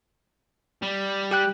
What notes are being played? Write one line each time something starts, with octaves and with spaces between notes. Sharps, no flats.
G3
G4 G5 F#6